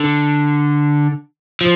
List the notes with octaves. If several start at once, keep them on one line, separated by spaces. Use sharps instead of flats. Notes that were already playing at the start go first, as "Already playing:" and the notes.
Already playing: D3
F3